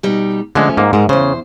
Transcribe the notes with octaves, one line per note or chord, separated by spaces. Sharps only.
B2 G3 D#4
D3 F3 G#3 A3 C#4
G#2 A#3
G#2 G#3 A#4
E2 C#3 C5